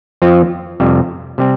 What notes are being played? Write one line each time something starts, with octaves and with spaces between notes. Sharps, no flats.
F2 F3 C4 F4
F2 C3 G3
C3 G3 C4